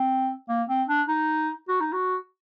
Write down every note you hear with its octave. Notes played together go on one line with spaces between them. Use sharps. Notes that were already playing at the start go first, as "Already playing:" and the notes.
Already playing: C4
A#3
C4
D4
D#4
F#4
D#4
F#4